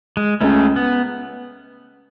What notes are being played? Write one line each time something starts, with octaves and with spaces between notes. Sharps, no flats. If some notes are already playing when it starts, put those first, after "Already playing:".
G#3
C#2 C#3 G#3 A3 C#4
B3